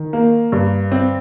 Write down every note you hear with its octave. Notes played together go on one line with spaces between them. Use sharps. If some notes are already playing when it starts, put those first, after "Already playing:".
Already playing: D#3
A#3
G2
C4